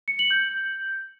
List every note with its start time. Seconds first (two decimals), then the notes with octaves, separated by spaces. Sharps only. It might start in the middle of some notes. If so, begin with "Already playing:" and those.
0.08 C#7
0.19 F#7
0.31 G6